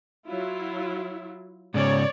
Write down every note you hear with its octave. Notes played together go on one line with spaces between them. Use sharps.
F#3 E4 F4
G#2 C#3 C#5 D5